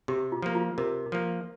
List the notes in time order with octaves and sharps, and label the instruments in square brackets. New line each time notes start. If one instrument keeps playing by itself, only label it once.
[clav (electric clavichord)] C3 [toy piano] G4
[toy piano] F4
[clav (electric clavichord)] F3 A#3
[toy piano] F4
[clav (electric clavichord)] C3 [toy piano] A#4
[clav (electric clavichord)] F3 A#3